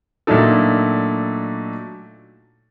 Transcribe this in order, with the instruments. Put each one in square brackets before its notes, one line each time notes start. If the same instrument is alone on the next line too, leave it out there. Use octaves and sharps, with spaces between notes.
[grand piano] A#2 F#3 A3 D4 D#4 A4